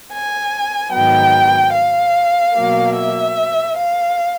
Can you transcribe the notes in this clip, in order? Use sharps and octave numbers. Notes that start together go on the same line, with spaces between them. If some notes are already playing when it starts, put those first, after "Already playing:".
G#5
G#2 D#3 F#3 B3 G5
F5
B2 F#3 A#3
E5
F5